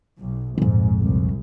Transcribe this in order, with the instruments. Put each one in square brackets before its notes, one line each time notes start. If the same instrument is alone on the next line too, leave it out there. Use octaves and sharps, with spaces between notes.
[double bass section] B1
[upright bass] A#1 F2 [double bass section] G#2
[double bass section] C2